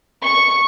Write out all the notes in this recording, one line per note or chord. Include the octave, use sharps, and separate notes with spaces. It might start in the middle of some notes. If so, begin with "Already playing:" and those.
C#6